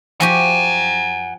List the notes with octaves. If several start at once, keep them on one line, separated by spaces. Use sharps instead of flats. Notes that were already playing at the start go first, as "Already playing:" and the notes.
F3 F#4 G4 F#5 G#5